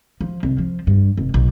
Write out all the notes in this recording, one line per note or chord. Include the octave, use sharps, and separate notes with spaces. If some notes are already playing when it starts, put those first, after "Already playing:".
F3
C2
F3
G2
F1
B1